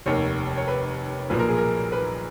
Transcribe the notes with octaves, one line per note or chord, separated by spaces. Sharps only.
F1 D#2 D#3 C#5
C#5
B4
B1 A#2 F3 B4
A#4
G#4
A#4
B4